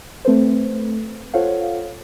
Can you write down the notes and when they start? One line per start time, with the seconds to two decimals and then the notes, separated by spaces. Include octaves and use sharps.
0.25 A3 C4 A4 B4 C5
1.34 F4 A4 C5 C#5 F5 F#5